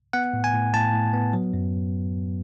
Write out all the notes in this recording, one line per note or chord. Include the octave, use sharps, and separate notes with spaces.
B3 F#5
A2
G#5
A2
A2 A5
A2
B3
F#3
F#2